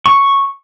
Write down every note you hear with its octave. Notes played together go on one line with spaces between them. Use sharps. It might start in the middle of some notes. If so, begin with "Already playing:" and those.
C#6